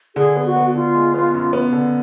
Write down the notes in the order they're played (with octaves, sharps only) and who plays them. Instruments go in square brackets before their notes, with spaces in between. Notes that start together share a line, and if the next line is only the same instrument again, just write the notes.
[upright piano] D3 [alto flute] G#4
[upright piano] B3
[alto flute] F#4
[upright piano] B3
[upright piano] D3 [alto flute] F4
[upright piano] G#3
B3
F#2
B3
D3